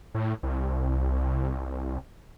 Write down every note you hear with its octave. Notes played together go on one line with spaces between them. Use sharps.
A2
C2